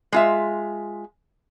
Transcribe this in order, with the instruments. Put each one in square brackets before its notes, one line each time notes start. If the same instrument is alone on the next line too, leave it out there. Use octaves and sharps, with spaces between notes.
[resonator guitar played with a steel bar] G#3 F4 E5